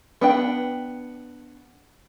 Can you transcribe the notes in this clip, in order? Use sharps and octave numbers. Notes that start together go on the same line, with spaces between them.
B3 D4 G5